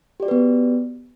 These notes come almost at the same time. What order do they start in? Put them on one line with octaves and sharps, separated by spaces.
G4 D5 F#4 B4 B3